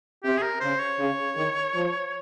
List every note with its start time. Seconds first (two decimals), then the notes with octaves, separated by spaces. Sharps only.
0.23 C3 G4
0.37 G#4
0.42 A#4
0.60 C#3 C5
0.79 C#5
0.98 C#3
1.35 D#3
1.73 F3